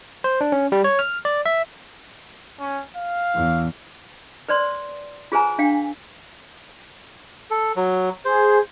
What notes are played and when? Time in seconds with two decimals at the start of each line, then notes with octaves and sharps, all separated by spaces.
0.24 C5
0.41 D4
0.52 C#4
0.72 G3
0.84 C#5
0.99 F6
1.25 D5
1.46 E5
2.60 C#4
2.96 F5
3.35 E2
4.49 B4 C5 D5 C6
5.32 F4 G#4 B4 C5 G#5 A#5
5.58 D4 F5 G5
7.51 A4
7.76 F#3
8.25 G#4 C5